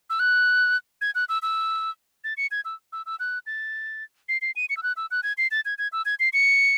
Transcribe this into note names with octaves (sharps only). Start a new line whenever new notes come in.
E6
F#6
G#6
F#6
E6
E6
A6
C#7
G#6
E6
E6
E6
F#6
A6
C7
C7
D#7
C#7
E6
F#6
E6
F#6
G#6
C7
A6
G#6
G#6
E6
G#6
C7
C#7